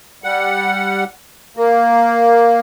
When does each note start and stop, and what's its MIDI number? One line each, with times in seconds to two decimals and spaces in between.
0.24 1.04 55
0.24 1.04 78
1.57 2.60 58